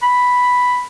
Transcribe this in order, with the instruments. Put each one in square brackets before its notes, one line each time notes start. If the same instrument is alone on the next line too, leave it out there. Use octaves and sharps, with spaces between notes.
[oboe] B5